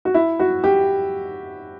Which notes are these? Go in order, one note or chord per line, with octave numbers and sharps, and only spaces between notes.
F#4
E4
F#4
G4